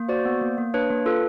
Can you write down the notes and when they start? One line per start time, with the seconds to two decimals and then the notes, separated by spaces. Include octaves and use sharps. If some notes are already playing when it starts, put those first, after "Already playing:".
Already playing: A#3
0.09 F#4 C5 D5
0.25 B3
0.41 A#3
0.58 A#3
0.74 D4 B4 C#5
0.90 A#3
1.06 F4 A4 B4